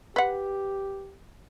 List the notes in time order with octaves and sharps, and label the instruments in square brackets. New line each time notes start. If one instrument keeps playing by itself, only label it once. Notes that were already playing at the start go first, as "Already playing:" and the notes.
[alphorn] G4 [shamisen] B4 F#5